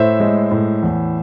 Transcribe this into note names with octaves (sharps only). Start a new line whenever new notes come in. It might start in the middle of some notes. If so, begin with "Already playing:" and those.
Already playing: A2 C5 E5
G#3
A2
E2